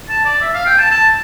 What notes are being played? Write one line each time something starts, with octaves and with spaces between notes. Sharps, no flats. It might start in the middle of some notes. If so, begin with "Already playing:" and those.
A5
D5
E5
F5
G5
A5
A5